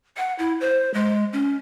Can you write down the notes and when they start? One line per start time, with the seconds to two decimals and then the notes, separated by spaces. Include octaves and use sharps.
0.17 F#5
0.39 E4
0.61 C5
0.94 G#3
1.33 C#4